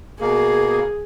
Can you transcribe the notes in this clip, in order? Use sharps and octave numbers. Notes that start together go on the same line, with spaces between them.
B2 A#3 G#4